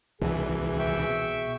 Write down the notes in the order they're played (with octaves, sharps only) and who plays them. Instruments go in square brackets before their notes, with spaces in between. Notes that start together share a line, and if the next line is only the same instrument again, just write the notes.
[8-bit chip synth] C2 E3 [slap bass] B2 [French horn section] G#4
[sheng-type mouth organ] E5 G5 C#6